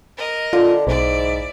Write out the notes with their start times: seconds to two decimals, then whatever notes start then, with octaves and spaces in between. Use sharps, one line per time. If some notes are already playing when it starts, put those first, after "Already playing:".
0.17 A#4 D#5
0.53 D3 F4
0.87 B1 G#2 E4 D5